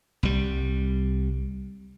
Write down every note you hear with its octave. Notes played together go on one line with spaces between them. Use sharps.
C2 G3